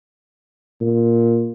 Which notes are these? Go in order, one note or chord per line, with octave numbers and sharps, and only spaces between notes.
A#2